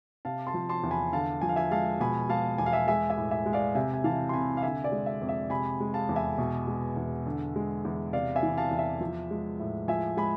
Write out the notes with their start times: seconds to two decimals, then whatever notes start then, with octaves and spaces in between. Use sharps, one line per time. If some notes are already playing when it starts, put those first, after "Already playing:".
0.25 C3 F5 A5
0.47 A5 C6
0.54 F3
0.69 A5 C6
0.83 E2
0.91 G#5 B5
1.12 D3 F5 A5
1.41 F3 G#5
1.49 F5
1.56 E5 G#5
1.71 G#3 F5 A5
2.00 B2 G#5 B5
2.29 G#3 F5 A5
2.58 E2 G#5
2.66 F5
2.72 E5 G#5
2.88 G#3 E5 G#5
3.10 E5 G#5
3.18 A2
3.31 E5 G#5
3.46 G#3
3.53 D5 F5
3.75 C3 E5 G#5
3.94 G#5
4.04 E3 F5 A5
4.29 C6
4.33 C2 G#5 B5
4.57 F5
4.63 D3 E5 G#5
4.84 D5
4.92 G#3
5.06 E5
5.21 F2
5.29 E5
5.50 C3 G#5 B5
5.80 G#3
5.94 F5 A5
6.09 E2
6.16 E5 G#5
6.38 B2
6.67 G#3
6.97 E2
7.26 D3
7.56 G#3
7.85 E2
8.13 C3 D5 F5
8.36 E5 G#5
8.43 E3
8.57 F5 A5
8.71 E2
8.79 E5
9.01 F3
9.31 G#3
9.60 A2
9.88 F3 E5 G#5
10.17 G#3 G#5 B5